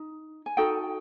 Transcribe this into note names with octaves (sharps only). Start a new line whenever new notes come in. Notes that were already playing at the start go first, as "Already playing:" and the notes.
Already playing: D#4
G#5
D#4 F#4 A4 G5